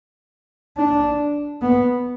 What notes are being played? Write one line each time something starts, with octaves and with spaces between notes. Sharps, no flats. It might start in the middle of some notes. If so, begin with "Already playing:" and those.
D4
B3